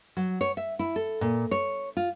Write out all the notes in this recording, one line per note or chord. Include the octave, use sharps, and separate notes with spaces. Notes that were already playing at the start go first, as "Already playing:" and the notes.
F#3
C#5
E5
E4
A4
A#2
C#5
F4